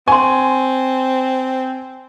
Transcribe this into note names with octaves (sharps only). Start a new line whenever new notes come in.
C4 G#5 C6 C#6